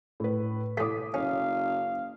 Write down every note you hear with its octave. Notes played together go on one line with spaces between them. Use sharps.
A2 B4
A2 A3 D6 D#6 B6
F#1 C#4 F5